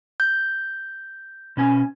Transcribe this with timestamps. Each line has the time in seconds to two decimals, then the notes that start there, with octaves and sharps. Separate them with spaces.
0.20 G6
1.57 B2 C#4 G#5